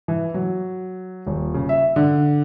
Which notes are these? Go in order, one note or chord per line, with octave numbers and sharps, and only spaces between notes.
E3
F#3
D#1
C#3
E5
D3